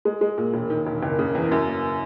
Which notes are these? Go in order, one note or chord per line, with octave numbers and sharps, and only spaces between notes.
G#3
G#3
A#2
E1
D#3
E1
F#1
C#3
E2
F#2
A#3